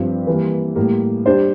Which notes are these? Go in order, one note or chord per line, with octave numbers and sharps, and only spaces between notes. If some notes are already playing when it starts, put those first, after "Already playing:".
Already playing: G2 F3 C4 G4
E3 G3 A#3
A2 G3 A#3
G3 D4 G4 C5